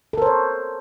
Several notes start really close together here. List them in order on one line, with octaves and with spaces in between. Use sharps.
A4 A#4 C5 C#5